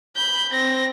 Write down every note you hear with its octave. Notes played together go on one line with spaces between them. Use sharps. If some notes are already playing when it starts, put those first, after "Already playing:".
B5 G6
C4 A#6